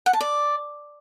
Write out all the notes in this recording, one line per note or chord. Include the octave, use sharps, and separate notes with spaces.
F#5
A5
D5